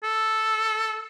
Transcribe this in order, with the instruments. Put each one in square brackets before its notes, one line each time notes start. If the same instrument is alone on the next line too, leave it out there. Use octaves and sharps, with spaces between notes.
[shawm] A4